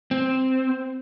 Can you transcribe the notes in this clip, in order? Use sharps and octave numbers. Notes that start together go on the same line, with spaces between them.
C4